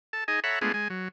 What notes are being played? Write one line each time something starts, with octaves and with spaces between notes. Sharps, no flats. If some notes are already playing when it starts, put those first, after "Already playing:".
A4 A5
D#4 G#4 D#5 G#5
A4 C#5 E5 F#5 A#5 B5
G#3 A3 B3 D4 F4 G#4
G#3 G#5
F#3